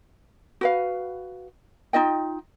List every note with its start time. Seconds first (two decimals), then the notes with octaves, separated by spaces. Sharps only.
0.61 F#4 B4 F5
1.93 D#4 F4 D#5 G5